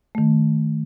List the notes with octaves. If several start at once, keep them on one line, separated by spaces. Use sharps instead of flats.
D#3 A3